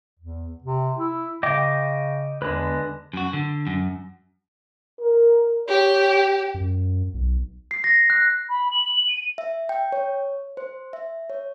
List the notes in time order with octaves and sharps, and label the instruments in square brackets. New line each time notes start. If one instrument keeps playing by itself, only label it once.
[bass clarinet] E2
C3
E4
[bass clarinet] C#3 [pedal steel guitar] D#5 G5 D6
[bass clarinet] E2 [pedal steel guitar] D3 G#3 B4
[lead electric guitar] F#2 F#4
D3
F#2
[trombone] A#4
[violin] G4 [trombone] C#5
[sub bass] F#2
B1
[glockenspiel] C7
A#6
F#6
[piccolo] B5
F#7
D#7
[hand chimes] E5
G5
C#5
C5
E5
C#5